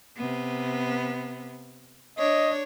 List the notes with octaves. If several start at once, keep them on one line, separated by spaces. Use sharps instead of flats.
C3 B3
D4 C#5 D#5